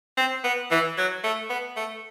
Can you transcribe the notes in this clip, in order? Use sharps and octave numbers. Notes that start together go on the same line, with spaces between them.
C4
B3
E3
F#3
A3
B3
A3